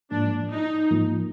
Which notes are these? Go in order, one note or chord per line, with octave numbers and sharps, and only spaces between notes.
G#2 F3 A#3 D4
D#4
G#2 F3 A#3